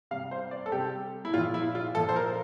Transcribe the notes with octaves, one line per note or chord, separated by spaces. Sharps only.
C3 G3 F5
C5
D5
A4
C3 G3 G4
E4
A#2 F3 F4
E4
F4
A#2 F3 A4
C5
A#4